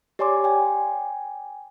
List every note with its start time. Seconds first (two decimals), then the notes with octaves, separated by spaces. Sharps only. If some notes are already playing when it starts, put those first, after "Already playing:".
0.19 G4 C#5 D5 G#5 C6 D6
0.44 G5 G#5